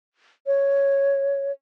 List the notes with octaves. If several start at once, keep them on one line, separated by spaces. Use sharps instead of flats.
C#5